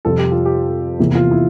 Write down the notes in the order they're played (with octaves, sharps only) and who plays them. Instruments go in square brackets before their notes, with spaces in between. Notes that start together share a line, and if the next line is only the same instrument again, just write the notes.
[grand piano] F2 C3 G3 [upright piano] A4
[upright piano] G4
F4
G4
[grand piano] E2 C3 E3 A#3
[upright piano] F4
E4